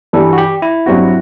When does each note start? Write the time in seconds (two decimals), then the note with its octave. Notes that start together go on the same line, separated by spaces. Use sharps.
0.13 G2 E3 G3 A4
0.33 F#4
0.38 G4
0.62 E4
0.86 G2 F#3 C4 F#4